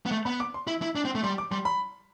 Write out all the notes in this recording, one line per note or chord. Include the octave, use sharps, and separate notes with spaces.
B3
A3
B3 B5
D6
C6
E4
E4
D4
C4
A3
G3 C6
D6
G3 C6
B5